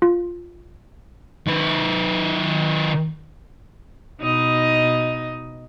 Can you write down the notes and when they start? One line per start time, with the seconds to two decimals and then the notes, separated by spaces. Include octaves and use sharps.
0.02 F4
1.48 D#3 B4
4.20 B2 D#4 D#5